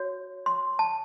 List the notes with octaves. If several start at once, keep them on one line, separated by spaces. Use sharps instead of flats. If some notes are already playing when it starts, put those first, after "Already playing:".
Already playing: F#4 C#5
C6
A5